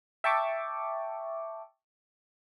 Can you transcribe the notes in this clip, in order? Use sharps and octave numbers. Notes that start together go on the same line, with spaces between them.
E5 G5 A5 C#6 D6